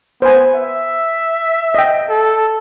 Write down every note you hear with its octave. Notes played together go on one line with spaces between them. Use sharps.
B3 C5 G#5
E5
D#5 G5
A4